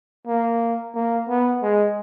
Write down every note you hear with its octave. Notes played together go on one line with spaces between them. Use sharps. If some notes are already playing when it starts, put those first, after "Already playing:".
A#3
A#3
B3
G#3